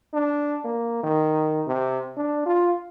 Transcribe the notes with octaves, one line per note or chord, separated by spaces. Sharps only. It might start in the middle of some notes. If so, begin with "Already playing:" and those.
D4
A#3
D#3
C3
D4
F4